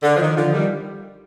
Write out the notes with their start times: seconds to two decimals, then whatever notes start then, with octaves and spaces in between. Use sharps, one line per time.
0.02 D3
0.16 F3
0.20 D#3
0.36 D3 F3
0.53 D#3 G3